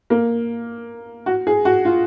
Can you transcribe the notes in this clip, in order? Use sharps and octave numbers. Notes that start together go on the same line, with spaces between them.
A#3
F#4
G#4
F#4
F4